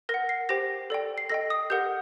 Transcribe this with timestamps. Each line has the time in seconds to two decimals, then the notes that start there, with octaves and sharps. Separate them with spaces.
0.09 A#4 A#6
0.14 F#5
0.29 C7
0.49 G4 C5 G5 A#6
0.90 A4 D5 G5
1.18 C7
1.29 A4 D#5 G5 A#6
1.50 D#6
1.70 G4 A#4 F#5 G6